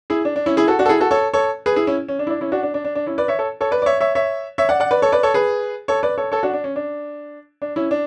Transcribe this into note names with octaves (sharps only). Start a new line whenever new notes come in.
E4 G#4
D4
D4
C#4 E4
E4 G#4
F#4 A4
D4 F#4
A4
E4 G#4
F#4 A4
A4 C#5
A4 C#5
G#4 B4
E4 G#4
C#4 E4
C#4
D4
E4
D4
C#4 E4
D4 F#4
D4
D4
D4
D4
C#4 E4
B4 D5
C#5 E5
A4 C#5
A4 C#5
B4 D5
D5
C#5 E5
C#5 E5
C#5 E5
C#5 E5
D5 F#5
D5 F#5
B4 D5
A4 C#5
B4 D5
A4 C#5
G#4 B4
A4 C#5
B4 D5
A4 C#5
A4 C#5
D4 F#4
D4
C#4
D4
D4
C#4 E4
D4